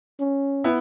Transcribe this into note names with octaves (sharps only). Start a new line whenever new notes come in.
C#4
B3 E4